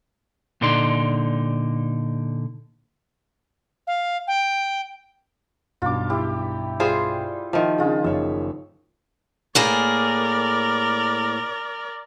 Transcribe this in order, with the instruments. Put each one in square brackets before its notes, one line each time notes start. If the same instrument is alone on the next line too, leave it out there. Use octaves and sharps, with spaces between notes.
[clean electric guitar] A#2 D3 D#4 D5 C6
[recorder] F5
G5
[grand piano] B1 G2 [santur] F4 D6
[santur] E4 G4
[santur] G3 [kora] F4 G#4 C5
[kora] D#3 F3 [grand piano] E5 F5 C6
[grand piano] C#3 D4 [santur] F4 G#4
[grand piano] F#1 C#5 [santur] E5
[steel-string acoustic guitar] A2 A#3 G#4 [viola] A#4 D5